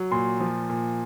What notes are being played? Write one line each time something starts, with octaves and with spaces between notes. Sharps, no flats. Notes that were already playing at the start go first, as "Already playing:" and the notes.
Already playing: F#3
A#2 C6
F3
A#2